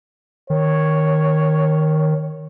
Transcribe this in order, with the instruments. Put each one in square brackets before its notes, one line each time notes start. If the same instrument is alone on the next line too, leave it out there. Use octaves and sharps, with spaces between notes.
[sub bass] D#3 [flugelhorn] C#5